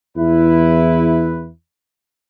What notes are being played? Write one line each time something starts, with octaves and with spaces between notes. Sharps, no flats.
E2 E4 B4